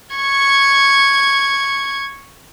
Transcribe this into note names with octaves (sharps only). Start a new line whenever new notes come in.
C#6 G#6